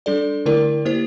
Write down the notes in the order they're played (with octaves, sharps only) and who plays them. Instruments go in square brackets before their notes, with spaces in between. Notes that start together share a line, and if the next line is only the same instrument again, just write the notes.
[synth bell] G3 D4 A4 D5
D3 A3 E4 A#4 D5
A#3 E4 G4 C5